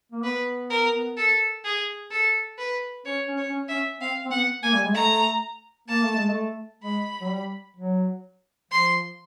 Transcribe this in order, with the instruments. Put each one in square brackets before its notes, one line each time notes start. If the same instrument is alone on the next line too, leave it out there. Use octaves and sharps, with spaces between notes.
[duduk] A#3
[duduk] B3 [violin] B4
[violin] A#4
A4
G#4
A4
B4
[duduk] C#4 [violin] C#5
[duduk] C#4
[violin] C#5
[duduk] C#4
[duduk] C#4 [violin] E5
[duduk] C4 [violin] F5
[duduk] C4
[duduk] B3 [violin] F#5
[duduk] A#3 [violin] G#5
[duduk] G3
G#3
[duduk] A3 [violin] A#5
[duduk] A#3 [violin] A5
[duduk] A3
G#3
A3
[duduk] G#3 [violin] B5
[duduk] F#3
G3
F#3
[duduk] F3 [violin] C6